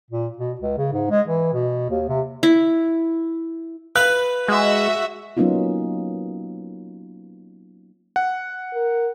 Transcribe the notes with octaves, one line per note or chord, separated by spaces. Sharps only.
A#2
B2
C#2
C#3
G#2
G#3
E3
B2
D#2
C3
E4
B4 F5 F#6
G#3 F#4 E5
F#3 A#3 B3 C#4 D#4 F4
F#5
A#4